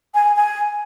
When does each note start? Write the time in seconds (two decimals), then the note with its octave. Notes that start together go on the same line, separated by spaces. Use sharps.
0.15 G#5
0.36 G#5